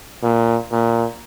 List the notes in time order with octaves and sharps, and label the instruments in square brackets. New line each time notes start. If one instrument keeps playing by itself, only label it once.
[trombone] A#2
A#2